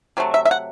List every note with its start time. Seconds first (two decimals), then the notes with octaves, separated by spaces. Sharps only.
0.17 C3 F#3 A3
0.34 E5
0.45 E5
0.51 F#5